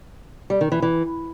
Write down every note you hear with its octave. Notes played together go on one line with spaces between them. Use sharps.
G3
D#3
E3
E3